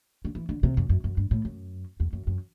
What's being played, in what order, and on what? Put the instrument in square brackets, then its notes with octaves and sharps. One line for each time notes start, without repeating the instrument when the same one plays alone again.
[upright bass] D3
E3
D3
C3
F#2
F#2
F#2
G2
A2
F#2
E2
F#2
F#2